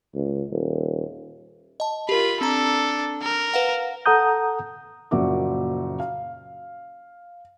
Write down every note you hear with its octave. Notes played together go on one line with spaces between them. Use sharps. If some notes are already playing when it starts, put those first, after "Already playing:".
C#2
D#1
D#5 A5
F4 G4 A#4 B5
C4 D4 A4 A#5
A#4
B4 F5 F#5
A4 F#5 A#5 D#6 G6
F#1 A#2 F3 F#4 E5 D6
F5